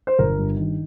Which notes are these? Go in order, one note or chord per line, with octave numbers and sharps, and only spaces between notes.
C5
G1 A#4
G2
D#3